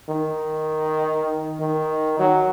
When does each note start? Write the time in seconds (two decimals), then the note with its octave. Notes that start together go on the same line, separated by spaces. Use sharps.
0.09 D#3
1.60 D#3
2.20 F#3